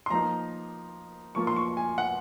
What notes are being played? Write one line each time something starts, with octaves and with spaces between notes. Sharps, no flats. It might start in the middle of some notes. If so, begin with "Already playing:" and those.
C6
F3 A#3 D#4 A#5
F3 A#3 F4 C#6
C6
C#6
G#5
F#5